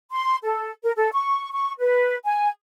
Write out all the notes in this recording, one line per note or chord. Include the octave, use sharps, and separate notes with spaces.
C6
A4
A#4
A4
C#6
C#6
B4
G#5